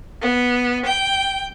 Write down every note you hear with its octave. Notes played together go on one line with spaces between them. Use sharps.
B3
G5